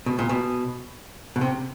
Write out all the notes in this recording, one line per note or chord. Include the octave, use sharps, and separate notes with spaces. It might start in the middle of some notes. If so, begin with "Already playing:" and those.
B2
A#2
B2
B2
C3